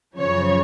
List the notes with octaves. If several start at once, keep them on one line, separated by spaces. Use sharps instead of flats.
F#2 C#3 F3 C#5